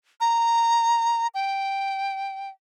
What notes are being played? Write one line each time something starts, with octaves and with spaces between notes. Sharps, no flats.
A#5
G5